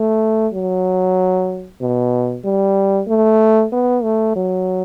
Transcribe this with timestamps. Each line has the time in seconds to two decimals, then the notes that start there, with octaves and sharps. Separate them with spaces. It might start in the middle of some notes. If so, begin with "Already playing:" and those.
Already playing: A3
0.54 F#3
1.81 B2
2.45 G3
3.08 A3
3.72 B3
4.03 A3
4.35 F#3